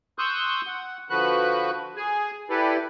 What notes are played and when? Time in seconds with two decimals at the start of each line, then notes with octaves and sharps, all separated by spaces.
0.19 C6 C#6 D#6 E6 F#6 G6
0.67 F#5
1.10 D3 F3 F#4 B4 F#6
1.96 G#4 G#5
2.50 E4 G4 A4 B4 D5